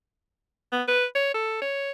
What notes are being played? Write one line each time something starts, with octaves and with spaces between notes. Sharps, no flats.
B3
B4
C#5
A4
C#5